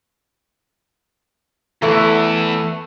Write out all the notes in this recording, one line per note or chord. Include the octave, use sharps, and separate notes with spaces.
E2 E3 A3 E4